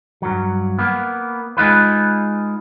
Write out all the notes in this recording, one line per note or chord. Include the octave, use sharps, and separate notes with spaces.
G2 F#3
A#3 B3
G#3 D#4 F4 B4